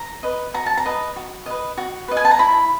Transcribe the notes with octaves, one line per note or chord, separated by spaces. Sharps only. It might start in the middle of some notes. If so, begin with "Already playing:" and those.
Already playing: A#5
B4 D#5
F#4 A#5
A5
A#5
B4 D#5
F#4
B4 D#5
F#4
B4 D#5
G#5
A5
A#5
E4 B5